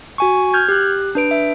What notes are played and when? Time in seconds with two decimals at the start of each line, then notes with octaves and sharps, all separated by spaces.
0.18 F#4 G#5 C#6
0.54 F6 G6 G#6
0.69 G4 F#6
1.15 D4 B4 D7
1.31 E5